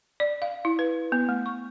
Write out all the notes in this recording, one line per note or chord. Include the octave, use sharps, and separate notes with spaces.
D5
F5
E4
B4
B3
A3
C#6